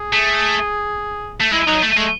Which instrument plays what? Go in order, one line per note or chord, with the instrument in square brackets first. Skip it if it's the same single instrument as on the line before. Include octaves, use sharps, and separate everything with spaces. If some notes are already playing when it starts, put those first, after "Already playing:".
Already playing: [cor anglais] G#4
[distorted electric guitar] A3
A3
[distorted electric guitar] G#3 [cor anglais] E4
[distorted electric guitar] F#3 [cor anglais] D#4
[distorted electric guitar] A3
[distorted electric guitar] G#3 [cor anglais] A3